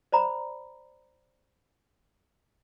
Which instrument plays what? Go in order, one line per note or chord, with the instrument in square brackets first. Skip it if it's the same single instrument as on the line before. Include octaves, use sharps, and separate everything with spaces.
[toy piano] C5 D5 A#5 B5